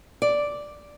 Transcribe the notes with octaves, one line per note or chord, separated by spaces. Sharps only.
D5